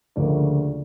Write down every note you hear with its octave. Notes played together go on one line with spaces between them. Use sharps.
D2 C#3 F3 A#3 D4 D5